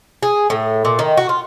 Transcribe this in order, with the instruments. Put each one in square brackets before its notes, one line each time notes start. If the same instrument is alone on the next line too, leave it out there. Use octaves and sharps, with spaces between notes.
[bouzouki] G#4
A2
A#2
D#3
F#4
F4